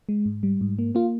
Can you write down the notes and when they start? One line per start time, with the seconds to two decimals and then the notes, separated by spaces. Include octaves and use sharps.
0.09 G#3
0.26 G#2
0.43 G3
0.61 G#2
0.79 A#3
0.95 A#3 F4